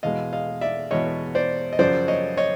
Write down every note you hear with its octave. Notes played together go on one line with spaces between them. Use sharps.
E2 B2 G#3 D#5 F5
D#5 F5
D5 E5
E2 B2 G#3 C#5 D#5
C5 D5
D#5
F#2 C#3 F3 C5 D5
C#5 D#5
C#5 D#5